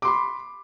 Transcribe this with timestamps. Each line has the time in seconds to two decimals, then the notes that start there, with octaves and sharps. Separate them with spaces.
0.02 D6
0.05 C6
0.07 B5